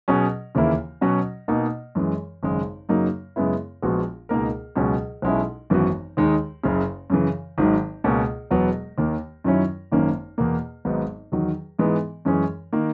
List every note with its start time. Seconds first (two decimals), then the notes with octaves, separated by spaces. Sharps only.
0.08 B2 F#3 C#4 G#4
0.55 D#2 C#3 E3 A#3 E4
1.01 B2 F#3 C#4 F#4
1.48 B2 A#3 D#4
1.95 F#2 E3 G#3
2.43 G#1 F#2 C#3 G#3
2.89 F#2 C#3 F#3 A#3 D#4
3.36 F#2 C#3 G#3 B3 E4
3.82 A#1 A#2 G#3 B3 F#4
4.29 C#2 B2 A#3 D#4 A#4
4.76 C#2 B2 F#3 C#4
5.22 B1 B2 G#3 C#4 E4
5.70 G#1 F#2 E3 B3 F#4
6.17 D#2 D#3 G#3 D#4
6.64 F#1 F#2 C#3
7.10 F#2 C#3 E3
7.58 G#1 G#2 D#3 F#3
8.04 C#2 B2 A#3 C#4
8.51 E1 E2 B2 F#3 B3
8.98 D#2 D#3 A#3
9.44 F#2 D#3 F#3 C#4 E4
9.92 G#1 F#2 D#3 A#3 C#4
10.38 E2 B2 A#3
10.85 G#1 G#2 F#3 B3 D#4
11.32 E2 D#3 F#3
11.79 G#2 E3 G#3 B3 D#4
12.25 F#2 E3 G#3 C#4 G#4
12.73 D#3 A#3